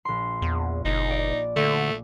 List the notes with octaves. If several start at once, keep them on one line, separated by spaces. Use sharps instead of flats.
A#1 C6
E2
F#1 D#4
D5
D3 A3